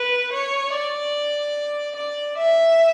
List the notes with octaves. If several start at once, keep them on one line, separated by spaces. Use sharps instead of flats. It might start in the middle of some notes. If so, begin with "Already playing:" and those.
Already playing: B4
C#5
D5
D5
E5